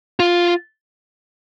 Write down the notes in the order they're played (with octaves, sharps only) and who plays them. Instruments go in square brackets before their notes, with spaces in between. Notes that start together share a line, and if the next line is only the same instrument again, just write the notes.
[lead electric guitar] F4